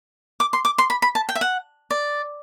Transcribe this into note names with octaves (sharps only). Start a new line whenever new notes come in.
D6
C6
D6
C6
B5
B5
A5
G5
E5
F#5
D5